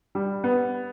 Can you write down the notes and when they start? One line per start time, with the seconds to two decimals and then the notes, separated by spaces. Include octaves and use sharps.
0.15 G3
0.44 B3